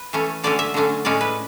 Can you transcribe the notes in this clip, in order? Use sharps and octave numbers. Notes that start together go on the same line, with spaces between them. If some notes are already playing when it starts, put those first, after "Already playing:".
Already playing: B4
E3 A3 C#4
D3 F#3 A3 C#4 D5
E5
D3 F#3 A3 C#4
A2 G#3 C#4 D5
B4